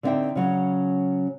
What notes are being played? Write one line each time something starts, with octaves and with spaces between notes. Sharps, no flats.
D3 B3 C4 D#4 E5 G5
C#3 F#3 C#4